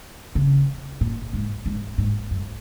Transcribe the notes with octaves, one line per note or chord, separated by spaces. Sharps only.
C#3
A#2
G#2
G#2
G#2
F#2